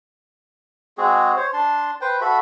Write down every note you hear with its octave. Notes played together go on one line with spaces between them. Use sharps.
G#3 C4 F#4 G#4
C5 C#5
D4 A5 C6
B4 C5 G5
F#4 A4 E5 B5